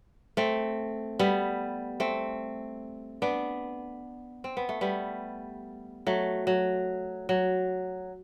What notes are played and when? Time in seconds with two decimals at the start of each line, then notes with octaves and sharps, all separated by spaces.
0.37 A3 C4
1.19 G3 B3
2.00 A3 C4
3.22 B3 D4
4.44 C4
4.57 B3
4.69 A3
4.81 G3 B3
6.07 F#3 A3
6.47 F#3
7.29 F#3